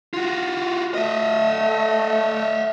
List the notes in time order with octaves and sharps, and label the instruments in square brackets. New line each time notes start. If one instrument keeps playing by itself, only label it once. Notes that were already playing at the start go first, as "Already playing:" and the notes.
[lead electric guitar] F4 F#4
[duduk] A3 [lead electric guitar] D#5 E5